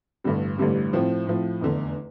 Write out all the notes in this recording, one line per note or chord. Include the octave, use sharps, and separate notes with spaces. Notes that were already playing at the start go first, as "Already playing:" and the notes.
A1 G2 D3 G3
A1 G2 D3 G3
A2 F3 C4
A2 F3 C4
F1 E2 D3